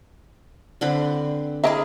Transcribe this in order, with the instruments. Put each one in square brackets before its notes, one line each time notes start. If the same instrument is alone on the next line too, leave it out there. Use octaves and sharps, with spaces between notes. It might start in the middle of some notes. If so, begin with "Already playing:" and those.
[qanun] D3 C4 B4
[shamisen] E4 D#5 E5 [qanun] G#4 A#4